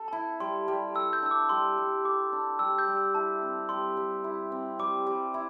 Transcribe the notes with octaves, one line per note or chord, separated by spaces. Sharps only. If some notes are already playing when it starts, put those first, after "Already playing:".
Already playing: A4
E4 A5
G3 C6
G3
A4 E6
G6
D4 E6
D6
G3 C6
G3
A4 D6
D4
G3 E6
G6
G3
E6
E4 A5
C4
G3 C6
G3
E4
C4
G3 D6
G3
E4